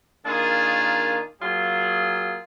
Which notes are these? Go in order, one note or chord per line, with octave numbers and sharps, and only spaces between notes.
D#3 A#3 D4 F4 G#4
F#3 A#3 F4 G#4